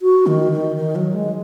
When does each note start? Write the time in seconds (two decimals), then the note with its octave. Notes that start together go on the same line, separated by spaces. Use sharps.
0.02 F#4
0.27 D#3
0.52 D#3
0.76 D#3
0.95 F#3
1.14 G#3